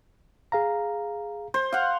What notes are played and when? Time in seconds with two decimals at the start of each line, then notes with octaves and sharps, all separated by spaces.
0.52 G#4 F5 A#5
1.54 C5
1.73 F5 F#5